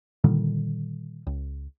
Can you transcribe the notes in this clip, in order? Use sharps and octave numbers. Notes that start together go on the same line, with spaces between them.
A#2 D3 D#3 G3
C#2